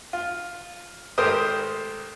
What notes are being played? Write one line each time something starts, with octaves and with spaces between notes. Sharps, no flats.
F4
G#1 A3 G4 A#4 C5 D#6